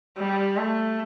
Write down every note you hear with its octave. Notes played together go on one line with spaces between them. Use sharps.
G3
A3